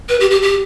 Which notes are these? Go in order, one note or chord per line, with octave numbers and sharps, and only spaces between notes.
B4
G4
G4
G4